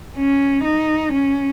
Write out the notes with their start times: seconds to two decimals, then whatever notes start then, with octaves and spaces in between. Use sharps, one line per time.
0.16 C#4
0.65 D#4
1.13 C#4